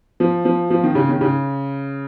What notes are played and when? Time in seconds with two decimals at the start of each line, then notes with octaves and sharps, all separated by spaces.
0.20 F3
0.45 F3
0.70 F3
0.84 D#3
0.95 C#3
1.09 D#3
1.21 C#3